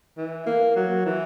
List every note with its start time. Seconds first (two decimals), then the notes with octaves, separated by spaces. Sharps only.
0.17 E3
0.46 A#3
0.76 F#3
1.06 E3